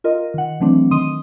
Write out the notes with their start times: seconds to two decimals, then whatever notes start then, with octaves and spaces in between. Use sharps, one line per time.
0.04 F4 A#4 D#5
0.34 D#3 F#5
0.60 E3 F#3 A3 C4 D4
0.91 D#3 C6 D#6 D#7